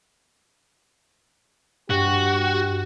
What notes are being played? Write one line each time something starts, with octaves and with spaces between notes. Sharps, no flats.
G2 F#4 G4